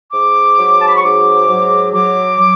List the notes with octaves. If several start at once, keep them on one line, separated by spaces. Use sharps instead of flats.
G#2 D6
F#3
A5
B5
C#6
G#2 D6
F#3
F#3 D6
F#3